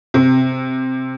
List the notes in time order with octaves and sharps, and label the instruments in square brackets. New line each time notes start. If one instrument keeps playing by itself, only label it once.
[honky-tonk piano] C3